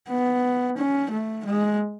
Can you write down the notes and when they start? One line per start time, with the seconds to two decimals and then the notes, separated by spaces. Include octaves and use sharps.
0.09 B3
0.78 C#4
1.11 A3
1.46 G#3